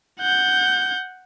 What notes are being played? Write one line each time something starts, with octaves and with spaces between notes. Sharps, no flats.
F#5 G6